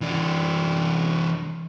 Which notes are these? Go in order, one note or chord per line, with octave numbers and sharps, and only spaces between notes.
E3 D4